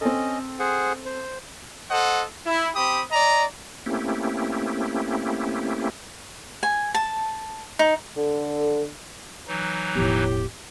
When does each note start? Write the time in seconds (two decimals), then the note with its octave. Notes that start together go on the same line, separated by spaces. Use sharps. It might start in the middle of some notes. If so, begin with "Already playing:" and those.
0.01 C4 C#4 A4 D#5
0.59 G#4 C5 F#5
1.06 C5
1.90 A4 C5 D#5 F#5
2.46 E4
2.75 C4 G4 B5 D#6
3.11 D5 D#5 A#5
3.86 A3 A#3 C4 C#4 E4 G4
6.63 G#5
6.94 A5
7.79 D#4
8.17 D3 A4
9.48 E3 F#3 D#4
9.95 E1 A2 F3 B3 G4